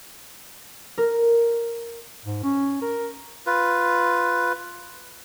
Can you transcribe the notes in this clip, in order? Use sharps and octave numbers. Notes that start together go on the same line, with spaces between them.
A#4
G#2
C#4
A#4
F4 B4